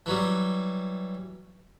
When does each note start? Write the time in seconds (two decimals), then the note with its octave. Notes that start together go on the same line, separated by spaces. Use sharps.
0.06 E3 F#3 G3